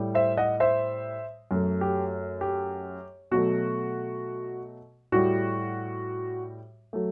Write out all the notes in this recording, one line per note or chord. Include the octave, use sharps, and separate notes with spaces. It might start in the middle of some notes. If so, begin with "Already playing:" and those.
Already playing: A2 G3
C5 E5
D#5 F#5
C5 E5
F#2 F#3 A3
G4
G4
B2 F#3 A3 F#4
A2 G3 F#4
F#3 A3